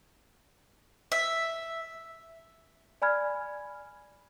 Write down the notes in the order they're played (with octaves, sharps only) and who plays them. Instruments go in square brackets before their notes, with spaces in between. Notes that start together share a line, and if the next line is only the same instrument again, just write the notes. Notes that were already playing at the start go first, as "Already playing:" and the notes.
[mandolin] E5
[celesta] D5 G#5 B5 F6 G#6